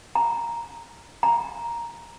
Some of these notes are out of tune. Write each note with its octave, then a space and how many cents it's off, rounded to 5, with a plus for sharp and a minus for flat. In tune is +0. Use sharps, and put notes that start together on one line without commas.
A#5 +0
A#5 +5